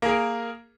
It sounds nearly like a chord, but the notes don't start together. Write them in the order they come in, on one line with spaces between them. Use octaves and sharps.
A#3 G#4 A#4